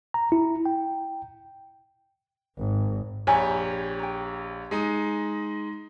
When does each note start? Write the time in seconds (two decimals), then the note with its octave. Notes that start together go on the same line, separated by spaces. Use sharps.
0.14 A#5
0.32 E4
0.66 G5
2.58 G#1
3.27 A#1 G4 C#5 G#5 A#5 B5
3.99 G5 A#5
4.71 G#3 D#4